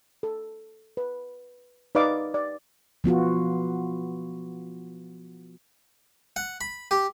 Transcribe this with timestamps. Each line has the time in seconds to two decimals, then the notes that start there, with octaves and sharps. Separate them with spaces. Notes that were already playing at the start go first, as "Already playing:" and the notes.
0.23 A4
0.97 B4
1.95 D#4 B4 D5 D#5 F5 D6
2.34 D5
3.04 F3 B3 F4 F#4
6.36 F#5
6.61 B5
6.91 G4